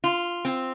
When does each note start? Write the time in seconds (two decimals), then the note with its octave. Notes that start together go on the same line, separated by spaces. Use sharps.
0.04 F4
0.45 C4